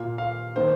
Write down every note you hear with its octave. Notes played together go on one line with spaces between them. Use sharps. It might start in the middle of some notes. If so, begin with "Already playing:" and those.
Already playing: A#2 A#3 F4 F5
F5
D#3 A#3 C5